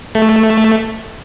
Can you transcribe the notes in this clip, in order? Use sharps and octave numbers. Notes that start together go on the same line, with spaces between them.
A3